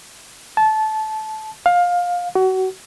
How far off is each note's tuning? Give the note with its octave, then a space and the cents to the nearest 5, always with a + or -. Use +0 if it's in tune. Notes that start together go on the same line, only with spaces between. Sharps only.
A5 -20
F5 +20
F#4 +25